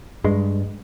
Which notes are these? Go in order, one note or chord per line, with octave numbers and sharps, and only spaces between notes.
G2 G#3